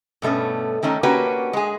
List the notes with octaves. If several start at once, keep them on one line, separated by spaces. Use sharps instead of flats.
G2 B2 A3 B3 C#4
D#3 A3 C#4 D#4
A#3 C#4 D4 F#4 G4 B4
G#3 G#4